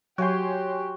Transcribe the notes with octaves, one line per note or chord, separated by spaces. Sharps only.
F#3 F#4 G4 C#5 G5 G#5 C6